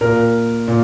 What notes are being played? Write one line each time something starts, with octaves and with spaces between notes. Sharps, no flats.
A#2 A#4
A#2